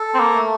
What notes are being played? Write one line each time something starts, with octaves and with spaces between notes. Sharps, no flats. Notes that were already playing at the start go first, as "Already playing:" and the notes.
Already playing: A4
C4
A#3
A3